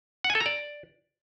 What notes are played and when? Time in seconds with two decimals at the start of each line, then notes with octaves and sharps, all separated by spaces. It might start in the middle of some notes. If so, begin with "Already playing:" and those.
0.24 F#5
0.30 G#5
0.35 A4
0.40 A#5
0.46 D5